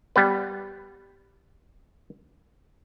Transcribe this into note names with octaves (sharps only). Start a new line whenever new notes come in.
G3 B3 B4